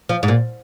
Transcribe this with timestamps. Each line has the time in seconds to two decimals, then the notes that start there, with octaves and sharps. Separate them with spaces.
0.09 F3
0.23 G#2
0.28 A#2